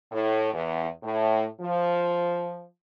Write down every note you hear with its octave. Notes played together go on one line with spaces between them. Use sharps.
A2
E2
A2
F3